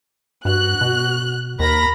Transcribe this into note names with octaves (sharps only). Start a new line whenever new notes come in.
G2 F#4 F#6
B2
D#2 A#4 A#5 B5 A#6